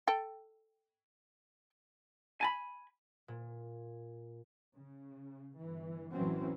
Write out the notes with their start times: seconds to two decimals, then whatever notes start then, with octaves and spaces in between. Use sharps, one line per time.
0.07 A4 G5
2.41 G#5 A5 B5
3.28 A#2
4.75 C#3
5.57 G1 E3
6.12 A1 F#2 E3 F#3 C4 C#4